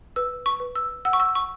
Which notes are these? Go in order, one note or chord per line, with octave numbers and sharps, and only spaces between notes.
B4 E6
C#6
B4
E6
F#5 E6
C#6
E6
C#6